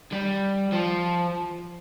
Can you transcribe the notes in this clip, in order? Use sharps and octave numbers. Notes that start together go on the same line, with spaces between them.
G3
F3